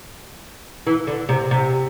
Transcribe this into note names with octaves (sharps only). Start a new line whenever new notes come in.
E3
D3
C3
C3